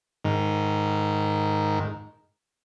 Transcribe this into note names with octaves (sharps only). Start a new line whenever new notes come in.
G#2 D#3